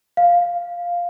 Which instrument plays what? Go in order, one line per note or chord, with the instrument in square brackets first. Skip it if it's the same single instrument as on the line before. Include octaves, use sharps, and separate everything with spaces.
[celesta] F5